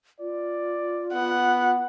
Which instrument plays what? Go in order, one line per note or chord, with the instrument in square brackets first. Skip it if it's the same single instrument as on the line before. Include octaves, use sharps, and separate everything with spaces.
[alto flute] F4 [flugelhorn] D5
[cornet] B3 [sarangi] F#5